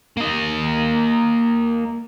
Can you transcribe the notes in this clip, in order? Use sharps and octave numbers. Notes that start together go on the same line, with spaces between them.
A#3 D#5